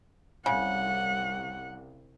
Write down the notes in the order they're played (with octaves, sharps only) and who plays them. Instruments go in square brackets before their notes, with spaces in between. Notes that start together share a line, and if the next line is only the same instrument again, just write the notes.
[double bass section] C2 [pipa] C#3 [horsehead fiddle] F#5